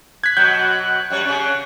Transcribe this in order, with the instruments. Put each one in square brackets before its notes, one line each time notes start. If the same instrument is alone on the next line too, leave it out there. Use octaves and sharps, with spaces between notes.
[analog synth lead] F#6 [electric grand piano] G#6 B6
[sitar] B2 F#3 [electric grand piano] G6
[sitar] F#2 G3 C#5
C#3 C#4